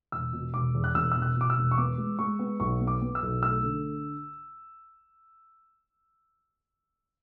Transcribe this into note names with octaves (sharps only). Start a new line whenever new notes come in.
E1 E6
B2
E1 D6
E2
F#6
E1 E6
B2 E6
F#6
B2 D6
E6
E1
C#6
B3 D6
G#3
G#3 C#6
B3
B1 C#6
B3
D6
B3
E6
B1
A3 E6
D3